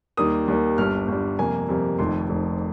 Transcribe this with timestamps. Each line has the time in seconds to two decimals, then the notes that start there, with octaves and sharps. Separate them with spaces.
0.17 D#2 D#3 G3 A#3 D#6
0.48 D#2 D#3 G3 A#3
0.78 G1 G2 G3 F6
1.08 G1 G2 G3
1.39 F2 C3 G3 A#3 G#5
1.69 F2 C3 G3 A#3
1.99 F1 F2 D#3 C6
2.29 F1 F2 D#3